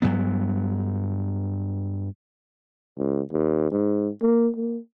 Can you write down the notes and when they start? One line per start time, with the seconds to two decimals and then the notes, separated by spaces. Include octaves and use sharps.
0.02 G2 F#3 B3
2.98 C#2
3.32 D#2
3.71 G#2
4.22 A#3
4.56 A#3